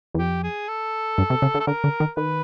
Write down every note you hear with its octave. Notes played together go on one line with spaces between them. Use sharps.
E2
F2 G4
G#4
A4
G2
C3
C#3
D3
A4
D3 A#4
D3
D#3
D#3 B4